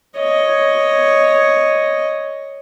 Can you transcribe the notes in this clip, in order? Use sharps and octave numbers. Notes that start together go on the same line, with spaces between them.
C#5 D#5